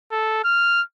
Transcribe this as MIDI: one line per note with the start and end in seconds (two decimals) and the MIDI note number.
0.11 0.40 69
0.44 0.81 89